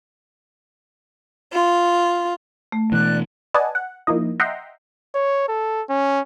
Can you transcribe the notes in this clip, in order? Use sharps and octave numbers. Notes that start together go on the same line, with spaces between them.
F4
A3
B2 E3 D5 F#6
B4 D5 D#5 F#5 G#5 A5
F#5
F3 A#3 D#4 E4 D#5
D#5 E5 F#5 G5 A#5 C6
C#5
A4
C#4